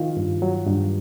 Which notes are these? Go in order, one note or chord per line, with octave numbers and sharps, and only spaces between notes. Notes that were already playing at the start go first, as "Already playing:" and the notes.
Already playing: D#3 F4
G2
F#3
G2